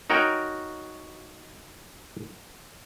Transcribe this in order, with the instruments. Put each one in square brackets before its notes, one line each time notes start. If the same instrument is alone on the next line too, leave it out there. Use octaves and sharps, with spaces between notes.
[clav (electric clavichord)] D#4 F#4 A#4 C#5 G5